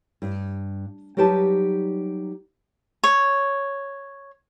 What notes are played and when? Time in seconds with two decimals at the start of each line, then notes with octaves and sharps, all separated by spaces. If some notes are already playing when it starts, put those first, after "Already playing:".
0.22 G2
1.17 F#3 G3 D#4 G4 B4 A5
3.04 C#5